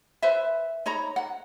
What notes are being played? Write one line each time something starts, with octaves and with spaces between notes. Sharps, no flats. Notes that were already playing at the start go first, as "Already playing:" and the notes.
B4 C5 E5
D#4 C#5 A#5 B5
F#5